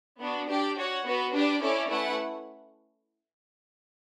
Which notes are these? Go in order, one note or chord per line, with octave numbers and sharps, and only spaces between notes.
B3 D4 F#4
D4 G4 D5 G5
F#4 C#5 F#5
B3 F#4 B4
D4 G4 B4 D5
C#4 E4 A4 D5
A3 C#4 E4 B4 F#5